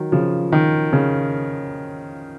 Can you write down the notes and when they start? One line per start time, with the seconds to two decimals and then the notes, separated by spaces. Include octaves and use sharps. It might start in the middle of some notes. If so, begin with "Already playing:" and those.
Already playing: D#3 F#3
0.12 C#3 F3
0.52 D#3
0.93 C#3